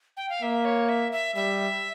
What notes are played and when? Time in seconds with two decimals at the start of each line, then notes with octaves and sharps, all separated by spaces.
0.17 G5
0.29 F5
0.42 A#3 E5
0.65 C#5
0.89 E5
1.12 E5
1.35 G3 E5